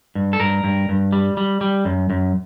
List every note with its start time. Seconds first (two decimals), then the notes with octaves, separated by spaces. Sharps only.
0.15 G2
0.33 A4
0.40 G2 A#4
0.64 G2
0.89 G2
1.13 G3
1.37 G3
1.61 G3
1.85 F#2
2.10 F#2